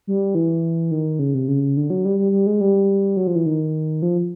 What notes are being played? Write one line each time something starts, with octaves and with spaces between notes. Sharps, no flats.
G3
E3
D#3
C#3
C3
C#3
D3
F#3
G3
G3
G3
G#3
G3
F#3
F3
E3
D#3
F3